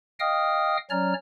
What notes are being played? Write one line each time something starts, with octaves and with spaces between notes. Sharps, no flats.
D#5 F5 G5 D#6 F6
F#3 C#4 C#5 D5 A#5 F6